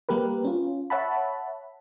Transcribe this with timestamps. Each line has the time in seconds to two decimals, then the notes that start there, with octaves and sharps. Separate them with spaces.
0.09 G3 A#3 G4 A#4 B4
0.44 C#4 F4
0.90 C#5 E5 F#5 A5 B5